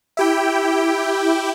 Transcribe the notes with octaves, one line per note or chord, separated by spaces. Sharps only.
E4 G4 G5